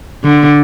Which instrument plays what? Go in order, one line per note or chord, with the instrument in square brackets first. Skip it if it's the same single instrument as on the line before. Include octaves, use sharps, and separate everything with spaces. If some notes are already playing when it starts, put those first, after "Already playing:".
[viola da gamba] D3